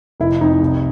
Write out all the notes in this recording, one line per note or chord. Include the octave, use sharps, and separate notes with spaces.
F1 E4
F2 D#4
C2